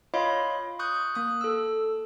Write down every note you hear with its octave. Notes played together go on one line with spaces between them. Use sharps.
F4 C#5 D#5 F5 B5 C6
C#6 D#6 F#6 G6
A#3 D#6 F#6
A4 E6